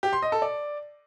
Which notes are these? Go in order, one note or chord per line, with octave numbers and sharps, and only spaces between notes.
G4
C6
D#5
A4
D5